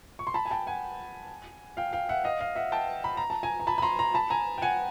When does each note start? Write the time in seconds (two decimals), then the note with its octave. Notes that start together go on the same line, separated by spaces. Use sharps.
0.19 C#6
0.27 C6
0.34 A5 B5
0.45 G#5
0.51 G5 A5
0.67 F#5 G#5
1.77 F5 G5
1.93 F5 G5
2.09 E5 F#5
2.24 D#5 F5
2.40 D#5 F5
2.56 E5 F#5
2.72 G5 A5
3.04 B5
3.17 A#5
3.30 A5
3.43 G#5 A#5
3.60 A#5
3.67 A5 B5
3.78 B5
3.82 A#5 C6
3.99 A#5 C6
4.14 A5 B5
4.30 G#5 A#5
4.58 G5
4.62 F#5 G#5